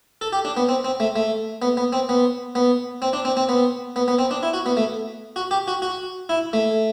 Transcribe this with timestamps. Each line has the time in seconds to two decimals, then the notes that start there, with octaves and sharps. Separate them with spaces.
0.21 A4
0.33 G4
0.45 D4
0.57 B3
0.69 C4
0.84 C4
1.00 A3
1.16 A3
1.62 B3
1.77 B3
1.93 C4
2.09 B3
2.55 B3
3.02 C4
3.13 D4
3.25 C4
3.37 C4
3.49 B3
3.96 B3
4.08 B3
4.19 C4
4.31 D4
4.43 E4
4.53 F#4
4.66 B3
4.77 A3
5.36 F#4
5.51 G4
5.68 F#4
5.82 F#4
6.29 E4
6.53 A3